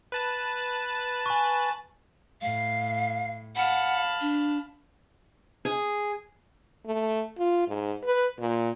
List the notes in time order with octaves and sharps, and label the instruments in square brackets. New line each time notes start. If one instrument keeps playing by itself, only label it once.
[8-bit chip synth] B4 A5 A6
[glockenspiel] G#5 C#6
[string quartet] A2 [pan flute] F5
[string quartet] F5 A5 B5 [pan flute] F#5
[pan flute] D4
[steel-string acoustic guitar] G#4
[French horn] A3
F4
G#2
B4
A#2